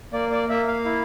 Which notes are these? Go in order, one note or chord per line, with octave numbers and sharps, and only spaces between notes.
A#3 D5
D5
A#3 E5
F5
E4